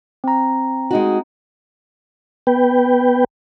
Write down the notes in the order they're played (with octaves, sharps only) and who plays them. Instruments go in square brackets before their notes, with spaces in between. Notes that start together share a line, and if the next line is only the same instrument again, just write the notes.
[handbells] C4 A#5
[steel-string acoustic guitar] G#3 D#4 F#4
[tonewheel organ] B3 B4 G5